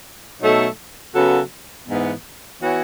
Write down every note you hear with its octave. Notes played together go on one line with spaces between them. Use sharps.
B2 F#3 A3 D#4 A4
C#3 F#3 B3 F#4 A4
G#2 E3 B3
E3 B3 F#4 C#5